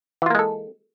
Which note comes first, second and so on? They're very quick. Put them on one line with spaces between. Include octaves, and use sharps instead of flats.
E3 F4 A#3 G#3 A4